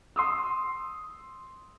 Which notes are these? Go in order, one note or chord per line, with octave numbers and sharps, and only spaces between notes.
C6 D#6 E6